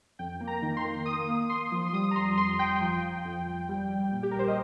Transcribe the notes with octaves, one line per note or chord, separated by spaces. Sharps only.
F2 G5
A#3
A#5
D#3
C6
A#3
A#3 D#6
A#3
A#3 C6
F3
C6
G3 D#6
A#5
F2 C6
F2 C6
G1 G5
F3
F3
F2
G1
G3
G3
A#2
G4
A#4
A#1 C5
D#5